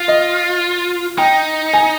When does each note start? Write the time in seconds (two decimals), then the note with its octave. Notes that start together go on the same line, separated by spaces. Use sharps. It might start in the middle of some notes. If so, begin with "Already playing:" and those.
Already playing: F4
0.08 D#5
1.18 D#4 G5
1.74 G#5